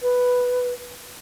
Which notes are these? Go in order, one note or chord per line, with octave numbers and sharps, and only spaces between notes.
B4